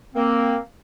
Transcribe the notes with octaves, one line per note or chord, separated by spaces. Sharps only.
A#3 C4